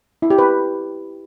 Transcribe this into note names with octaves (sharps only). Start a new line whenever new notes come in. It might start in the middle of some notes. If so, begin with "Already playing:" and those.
E4
G4
B4